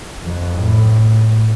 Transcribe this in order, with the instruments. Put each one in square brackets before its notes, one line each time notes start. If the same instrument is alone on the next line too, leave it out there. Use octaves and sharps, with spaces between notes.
[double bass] F2
A2